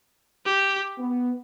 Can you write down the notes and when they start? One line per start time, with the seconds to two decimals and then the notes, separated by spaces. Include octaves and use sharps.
0.46 G4
0.98 B3